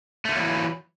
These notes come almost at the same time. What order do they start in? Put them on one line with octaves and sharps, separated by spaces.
A3 D3 A#3 F#3 E3